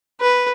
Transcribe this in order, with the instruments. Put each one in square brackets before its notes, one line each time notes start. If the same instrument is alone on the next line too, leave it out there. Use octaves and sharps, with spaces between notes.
[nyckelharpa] B4